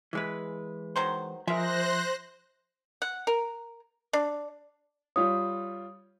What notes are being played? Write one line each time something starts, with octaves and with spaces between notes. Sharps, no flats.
E3 G#3 B4
D#3 F#3 C5
F3 G#3 A#4 C5 E5 F#6 A#6
F#5
A#4
D4
G3 F4 C#5 D#6